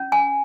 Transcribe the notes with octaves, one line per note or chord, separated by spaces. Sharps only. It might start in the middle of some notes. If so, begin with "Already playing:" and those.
Already playing: C#4
G#5